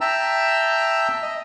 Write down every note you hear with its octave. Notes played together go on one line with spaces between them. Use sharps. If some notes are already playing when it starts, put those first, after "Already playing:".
E5 G5 A5 A#5 E6
D#5